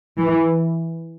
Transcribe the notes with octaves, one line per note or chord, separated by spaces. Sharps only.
E3